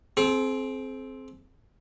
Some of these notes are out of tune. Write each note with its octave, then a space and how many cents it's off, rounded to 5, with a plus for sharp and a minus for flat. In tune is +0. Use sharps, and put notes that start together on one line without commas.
C4 +0 G#4 +45